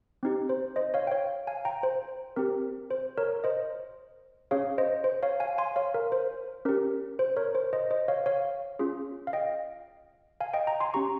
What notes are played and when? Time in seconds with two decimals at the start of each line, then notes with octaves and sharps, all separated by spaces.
0.23 C4 D#4 G4
0.49 C5
0.76 C5 D#5
0.94 C#5 F5
1.07 G5
1.12 C#5 F5
1.47 F5 G#5
1.65 G5 A#5
1.83 C5
2.36 C4 G4 A#4
2.91 C5
3.18 A#4 C#5
3.44 C5 D#5
4.51 C#4 G#4 C#5 F5
4.78 C5 D#5
5.04 C5
5.23 C#5 F5
5.40 F5 G#5
5.58 G#5 C6
5.76 C#5 F5
5.94 A#4
6.12 C5
6.65 C#4 G4 A#4
7.19 C5
7.37 A#4 C#5
7.55 C5
7.73 C5 D#5
7.91 C5 D#5
8.08 C#5 F5
8.26 C#5 F5
8.79 C#4 F4 G#4
9.27 F5
9.33 D#5 G5
10.41 F5 G#5
10.54 D#5 G5
10.67 G5 A#5
10.80 G#5 C6
10.94 C#4 G4 A#5 C#6